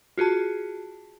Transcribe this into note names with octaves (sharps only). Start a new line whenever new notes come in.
F4 F#4 G#4 A5